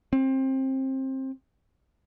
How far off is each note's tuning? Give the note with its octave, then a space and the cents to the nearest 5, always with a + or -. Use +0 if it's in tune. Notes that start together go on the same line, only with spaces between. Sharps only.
C4 +25